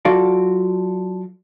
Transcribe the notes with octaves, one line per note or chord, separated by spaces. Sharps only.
F#3 F4 F#4 A4 D5 F5